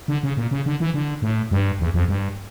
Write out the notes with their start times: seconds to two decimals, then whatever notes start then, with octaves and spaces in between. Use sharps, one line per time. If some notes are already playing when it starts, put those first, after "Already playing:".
0.08 D3
0.23 C#3
0.37 A#2
0.51 C#3
0.66 D3
0.80 E3
0.94 D3
1.22 A2
1.51 G2
1.80 E2
1.94 F2
2.08 G2